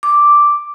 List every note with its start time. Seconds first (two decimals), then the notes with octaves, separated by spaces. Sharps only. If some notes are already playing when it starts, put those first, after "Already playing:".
0.03 D6